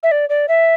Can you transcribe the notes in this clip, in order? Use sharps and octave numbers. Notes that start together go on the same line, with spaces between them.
E5
D5
D5
E5